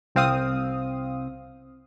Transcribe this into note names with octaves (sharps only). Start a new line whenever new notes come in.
C2 C4 F5 D#6